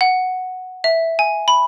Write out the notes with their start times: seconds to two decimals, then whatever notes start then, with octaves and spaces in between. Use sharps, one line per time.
0.01 F#5
0.84 E5
1.19 G#5
1.48 B5